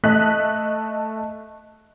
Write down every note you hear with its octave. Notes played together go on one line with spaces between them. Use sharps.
A3 D#5 F#6 B6